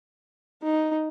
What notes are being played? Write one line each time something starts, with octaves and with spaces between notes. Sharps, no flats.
D#4